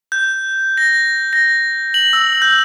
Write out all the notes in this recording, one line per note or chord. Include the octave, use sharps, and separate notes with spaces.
G6
A#6
A#6
F#7
E6
G6